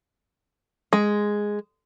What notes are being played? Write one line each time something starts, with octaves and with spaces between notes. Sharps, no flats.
G#3